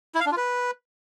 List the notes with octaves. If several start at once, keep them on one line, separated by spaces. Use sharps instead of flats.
E4
F5
D4
F4
B4